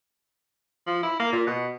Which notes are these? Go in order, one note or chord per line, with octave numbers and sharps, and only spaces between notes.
F3
E4
A#3
A#2
B2